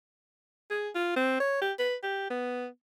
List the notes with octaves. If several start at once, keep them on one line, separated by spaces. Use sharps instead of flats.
G#4
F4
C4
C#5
G4
B4
G4
B3